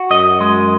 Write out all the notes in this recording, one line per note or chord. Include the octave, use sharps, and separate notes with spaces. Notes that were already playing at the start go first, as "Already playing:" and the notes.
Already playing: F#4
F#2 D#5
G#3